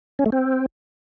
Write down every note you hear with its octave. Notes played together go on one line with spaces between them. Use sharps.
C#4
A3
C4